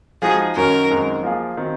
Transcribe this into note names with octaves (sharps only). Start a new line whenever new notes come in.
F3 G#3 D#4 F#4 G#4
F#2 D#3 F#3 C#4 A#4
F#2 D#3 G#3 C4 D#4
F3 A#3 F4 G#4
D#3 F#3 C4